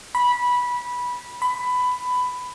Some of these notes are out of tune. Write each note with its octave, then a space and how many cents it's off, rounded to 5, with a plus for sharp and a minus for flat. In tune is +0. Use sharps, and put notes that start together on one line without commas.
B5 -15
B5 +15